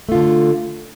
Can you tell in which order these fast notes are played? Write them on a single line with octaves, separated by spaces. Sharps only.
A3 F4 D3